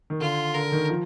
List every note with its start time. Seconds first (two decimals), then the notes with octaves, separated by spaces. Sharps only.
0.10 D#3
0.20 D3 F4
0.54 D3 A#4
0.72 D#3
0.89 F3